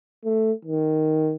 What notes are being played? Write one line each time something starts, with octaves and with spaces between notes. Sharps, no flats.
A3
D#3